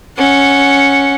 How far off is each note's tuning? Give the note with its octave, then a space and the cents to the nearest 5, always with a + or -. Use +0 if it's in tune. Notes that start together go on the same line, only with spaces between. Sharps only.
C#4 +0 F#5 -10